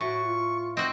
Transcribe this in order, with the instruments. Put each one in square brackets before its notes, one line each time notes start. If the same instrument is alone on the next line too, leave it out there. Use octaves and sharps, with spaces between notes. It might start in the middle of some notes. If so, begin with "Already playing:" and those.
[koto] A2 [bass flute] F#4 [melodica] C#6
[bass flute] F4
[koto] C4 F#4 [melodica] D#5